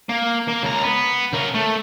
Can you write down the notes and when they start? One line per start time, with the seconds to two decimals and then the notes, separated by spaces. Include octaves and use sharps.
0.09 A#3
0.48 A#3
0.63 C#2 A#5
0.83 B3
1.33 C#3 A#4
1.55 A3